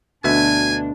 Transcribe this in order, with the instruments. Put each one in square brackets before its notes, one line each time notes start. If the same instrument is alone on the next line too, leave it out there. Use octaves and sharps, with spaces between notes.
[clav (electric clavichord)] D2 B2 E5 [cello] D4 [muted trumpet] G#5